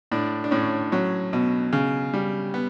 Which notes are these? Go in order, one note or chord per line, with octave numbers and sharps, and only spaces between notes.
A2 D4
D4
A2 C#4
F#3 C#4
B2
C#3
G3
B3